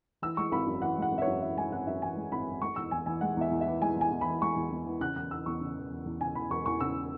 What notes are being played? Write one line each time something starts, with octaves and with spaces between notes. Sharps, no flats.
E3 E6
G#3 C#6
G#1 B5
F#2
E3 F#5
G#3 F#5
G#1
E5
C#5
F#2
E3 E5
G#3 G#5
G#1 F#5
F#2 E5
E3 G#5
G#3
G#1 B5
F#2
G#3 C#6
E2 E6
E2 G#5
E3 G#5
G#3 F#5
E2 E5
E2
E5
E3
G#3 G#5
E2 G#5
E2
E3 B5
G#3 C#6
E2
E2
E3
C#3 F#6
E1 F#6
E1 E6
E2 C#6
C#3
E1
E1
E2
C#3 G#5
E1 B5
E1 C#6
E2 C#6
C#3 E6